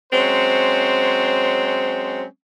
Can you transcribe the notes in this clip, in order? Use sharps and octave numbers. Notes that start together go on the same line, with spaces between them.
F#3 G#3 C4 C#4 C5